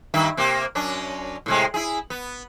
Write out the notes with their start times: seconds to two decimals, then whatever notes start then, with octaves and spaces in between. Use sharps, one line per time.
0.14 G2 D#3 E5
0.37 C3 A#3 G4
0.75 F#2 C#4 D4
1.46 A2 C3 G#3
1.74 E4 G#4
2.10 B3